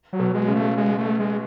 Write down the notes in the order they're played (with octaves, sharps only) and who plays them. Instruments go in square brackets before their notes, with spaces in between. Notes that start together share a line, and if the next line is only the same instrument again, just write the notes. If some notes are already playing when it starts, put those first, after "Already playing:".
[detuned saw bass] F#3
[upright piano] B2
[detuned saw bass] G#3
[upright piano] C#3
[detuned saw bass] A3
G#3
A3
G#3